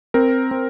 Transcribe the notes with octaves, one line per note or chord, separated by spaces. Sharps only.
C4 A#4
C4